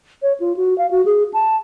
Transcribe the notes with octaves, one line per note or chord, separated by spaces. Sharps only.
C#5
F4
F#4
F5
F#4
G#4
A5